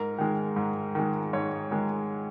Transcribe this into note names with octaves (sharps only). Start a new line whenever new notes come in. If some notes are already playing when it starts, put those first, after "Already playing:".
Already playing: G#2 A#4
D#3 G#3
G#2
D#3 G#3
G#2 C#5
D#3 G#3